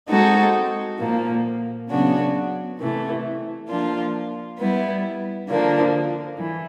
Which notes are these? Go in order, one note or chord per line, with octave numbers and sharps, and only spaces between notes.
G#3 C4 D#4 F#4 A4
A#2 F3 A#3
C#3 F#3 B3 D4 F#4
C3 E3 A3
F3 A#3 D4 F4
G3 B3 E4
D3 F3 A#3 D4
E3